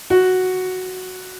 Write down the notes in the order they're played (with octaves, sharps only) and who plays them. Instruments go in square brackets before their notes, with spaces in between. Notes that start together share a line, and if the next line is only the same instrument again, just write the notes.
[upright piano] F#4